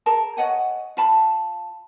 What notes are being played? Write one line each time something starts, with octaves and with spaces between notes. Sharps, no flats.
G#4 A#4 A5
C#5 D#5 F#5 G#5
F4 F5 A5 B5